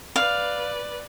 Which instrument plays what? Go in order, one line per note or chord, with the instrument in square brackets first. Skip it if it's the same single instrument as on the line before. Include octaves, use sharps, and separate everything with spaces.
[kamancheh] B4 D5 [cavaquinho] F5